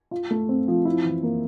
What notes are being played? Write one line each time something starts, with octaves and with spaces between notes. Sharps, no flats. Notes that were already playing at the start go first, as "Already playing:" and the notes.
F4
A3
C4
F3
E4
E3
A#3